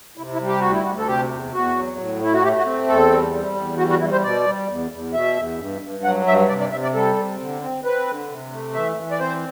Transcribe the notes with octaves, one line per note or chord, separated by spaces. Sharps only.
C3 E4
E4
G3
G4
D2 F#4
E4
D2 F#4
A4
C3 G4
E2
E2 F#4
F#3
A2
A3 E4
F#4
A3 G4
F#4
C4
E2 A4
G3
G3
E2
G3 F#4
F#4
G3 E4
C5
B2 D5
G3
E2
E2
B2 E5
E2
G2
G2
F#3 F#5
G2 E5
C3 D5
D5
C3 E5
D5
G3 A4
C3
D3
C4
C4 B4
D3
C3
A3
E3 E5
E3
D5
C4 C5